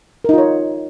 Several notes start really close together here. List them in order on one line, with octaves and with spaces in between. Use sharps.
A#4 D#4 F4 C#5